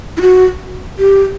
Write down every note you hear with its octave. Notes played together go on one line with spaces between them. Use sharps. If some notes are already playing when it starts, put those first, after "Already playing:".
E4
F#4
G4